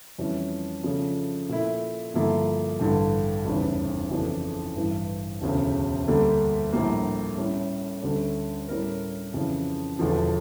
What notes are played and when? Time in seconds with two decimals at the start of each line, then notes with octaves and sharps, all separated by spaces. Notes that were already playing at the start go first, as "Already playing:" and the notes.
0.18 F2 E3 G3 C#4 E4
0.83 C#3 F3 A3 D4
1.49 A#2 A3 E4
2.14 G2 D3 F3 A#3 E4
2.80 A1 G2 D3
3.45 F1 E2 C#3 G3 C#4
4.11 F2 C#3 E3 A3 D4
4.76 A1 G2 E3
5.41 E1 D2 C#3
6.07 D2 D3 G3 A#3
6.73 A#1 A2 G3 A#3
7.37 A2 G3 C#4
8.02 D2 D3 G3 C#4
8.68 A2 G3 C#4 E4 A#4
9.34 F2 C#3 E3
9.99 E1 E2 D3 F3